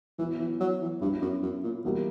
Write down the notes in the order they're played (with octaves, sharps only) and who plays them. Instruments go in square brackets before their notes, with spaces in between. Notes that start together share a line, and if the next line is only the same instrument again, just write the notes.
[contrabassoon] E3 [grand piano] F#3
[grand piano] B3 E4
[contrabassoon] E3
F#3
E3
[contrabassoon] G2 [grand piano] F#3 B3 E4
[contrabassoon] F#2
F#2
A#2
[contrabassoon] B2 [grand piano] E3 G3 A#3 E4 G4